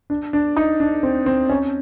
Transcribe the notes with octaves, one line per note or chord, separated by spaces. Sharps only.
D4
D4
D#4
D4
C4
C4
C#4